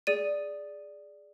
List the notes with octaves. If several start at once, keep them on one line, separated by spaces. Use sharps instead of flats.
G#4 D5 D#7